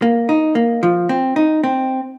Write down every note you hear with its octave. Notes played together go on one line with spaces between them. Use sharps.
A#3
D#4
A#3
F3
C4
D#4
C4